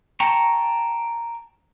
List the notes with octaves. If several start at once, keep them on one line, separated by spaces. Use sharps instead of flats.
G5 A5 A#5 C#6